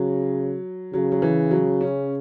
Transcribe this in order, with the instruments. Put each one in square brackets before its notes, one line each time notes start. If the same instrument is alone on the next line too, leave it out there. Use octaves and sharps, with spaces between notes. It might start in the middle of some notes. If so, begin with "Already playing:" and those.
Already playing: [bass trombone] C#3 [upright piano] F#3
[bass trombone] C#3 [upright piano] F#3
[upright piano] F#3
E3
F#3
C#4